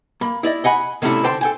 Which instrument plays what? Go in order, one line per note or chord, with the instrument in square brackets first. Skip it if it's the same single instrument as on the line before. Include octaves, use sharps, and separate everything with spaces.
[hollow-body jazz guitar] A#3 B5
E4 D5 D#5
D#5 F#5 G#5 B5
A2 C3 A3 C#4 D4 E4
D3 C5 G5 A5 B5 C6
A4 G5 G#5